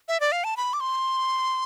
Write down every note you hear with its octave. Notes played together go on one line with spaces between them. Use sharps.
E5
D5
F5
A5
B5
D6
C6